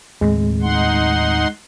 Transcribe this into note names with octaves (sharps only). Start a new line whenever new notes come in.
D#2 A2 G#3 C4
D#4 F#5 C6